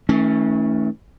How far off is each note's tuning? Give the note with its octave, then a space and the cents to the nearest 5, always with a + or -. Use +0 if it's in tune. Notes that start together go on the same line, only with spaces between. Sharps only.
E3 -45 A3 +0 C#4 -5